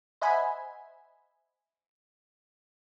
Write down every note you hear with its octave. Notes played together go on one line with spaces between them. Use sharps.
C5 D#5 E5 F#5 G#5 B5